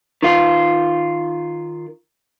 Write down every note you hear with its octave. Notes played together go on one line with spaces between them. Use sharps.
D#3 F4